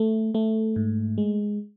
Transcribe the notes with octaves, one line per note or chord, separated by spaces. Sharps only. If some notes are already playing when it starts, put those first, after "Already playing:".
Already playing: A3
A3
G#2
G#3